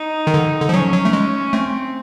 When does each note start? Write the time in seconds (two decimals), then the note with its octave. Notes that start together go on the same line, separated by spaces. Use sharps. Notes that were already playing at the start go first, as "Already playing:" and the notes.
Already playing: D#4
0.27 D#3
0.34 D3
0.60 D3
0.69 F3
0.74 F#3 C#4
0.93 F#3
1.05 A3
1.13 G#3
1.53 A3 C4